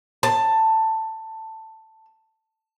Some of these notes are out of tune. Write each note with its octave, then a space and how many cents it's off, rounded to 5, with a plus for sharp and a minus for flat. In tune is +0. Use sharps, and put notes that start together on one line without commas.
A5 +10